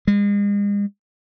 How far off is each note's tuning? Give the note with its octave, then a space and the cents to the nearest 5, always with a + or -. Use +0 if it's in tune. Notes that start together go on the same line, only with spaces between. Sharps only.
G#3 -40